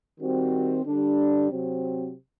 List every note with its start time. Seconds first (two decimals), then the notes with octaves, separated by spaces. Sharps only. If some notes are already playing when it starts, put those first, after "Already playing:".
0.18 D#3 G3 C4 F#4
0.84 D3 G3 D4
1.50 C3 F#3 C4